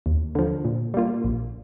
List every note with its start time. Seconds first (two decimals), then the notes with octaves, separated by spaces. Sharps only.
0.06 D#2
0.35 D3 F3
0.65 A#2
0.94 G3 A#3 F4
1.24 A#1